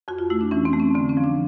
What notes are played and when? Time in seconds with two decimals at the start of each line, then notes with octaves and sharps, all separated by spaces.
0.08 F2 F#4
0.19 F4
0.30 A3 E4
0.41 D4
0.51 E3 C#4
0.65 C4
0.73 A3
0.80 C#4
0.94 D3 C4
1.09 C#4
1.17 F3
1.24 D4